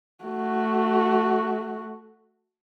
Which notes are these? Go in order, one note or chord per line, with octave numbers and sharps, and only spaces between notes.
A3 F#4